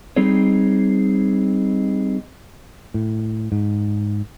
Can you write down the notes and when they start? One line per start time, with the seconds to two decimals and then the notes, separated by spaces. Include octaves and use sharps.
0.16 G3 C4 D#4 G#4 C#5
2.94 A2
3.52 G#2